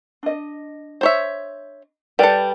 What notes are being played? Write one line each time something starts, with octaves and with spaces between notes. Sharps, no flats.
D4 D#5
C5 C#5 E5
G3 A4 B4 D5 G5